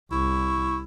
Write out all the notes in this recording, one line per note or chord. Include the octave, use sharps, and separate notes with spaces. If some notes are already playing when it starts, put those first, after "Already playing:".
C2 E4 C#6